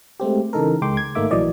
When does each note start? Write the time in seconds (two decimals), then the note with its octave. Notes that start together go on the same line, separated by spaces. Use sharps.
0.20 G#3 A3 C4 G4
0.53 C#3 E3 D#4 A4 A#4
0.82 C#2 G#3 G5 C6 D6
0.97 G#6
1.15 G#1 A3 A#3 D#4 E5 D6
1.31 A#1 E3 F#3 D5 D#5